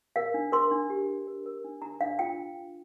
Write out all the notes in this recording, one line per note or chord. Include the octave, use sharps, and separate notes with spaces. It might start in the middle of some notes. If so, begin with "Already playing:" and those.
A#4 F5
D4
A#4 C6
D4
G4
D4
A#4
A#4
D4
D4 A#5
D4 F5
F4 G5